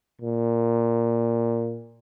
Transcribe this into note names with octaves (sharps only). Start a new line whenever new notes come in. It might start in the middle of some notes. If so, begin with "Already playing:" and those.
A#2